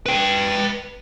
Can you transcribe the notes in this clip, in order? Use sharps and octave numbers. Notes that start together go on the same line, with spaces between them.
B4 G5